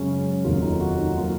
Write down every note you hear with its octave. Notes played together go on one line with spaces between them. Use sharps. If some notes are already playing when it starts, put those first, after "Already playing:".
Already playing: F#2 C#3 G#3 C#4
F1 D#2 D#3 F#3 A#3 F4
D#4
F#4
D#4
D#3 F#3 A#3 F4